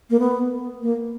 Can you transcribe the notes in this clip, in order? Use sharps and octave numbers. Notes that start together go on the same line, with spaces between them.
A#3
B3
A#3